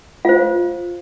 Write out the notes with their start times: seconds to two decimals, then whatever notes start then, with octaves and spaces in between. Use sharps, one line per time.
0.25 F4 C5 F5